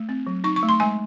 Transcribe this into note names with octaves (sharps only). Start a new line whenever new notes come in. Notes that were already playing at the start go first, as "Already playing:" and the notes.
Already playing: A3
C4
F#3
D#4 C#6
C#6
A3
C6
G#3 G#5